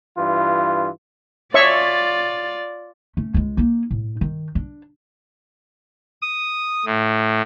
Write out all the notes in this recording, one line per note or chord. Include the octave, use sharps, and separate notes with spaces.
G2 E3 F4
F4 C#5 D5 E5 C#6
A3 C#4
C#2 G#3
A#3 D#4
A2
D#3
D4
D#6
A2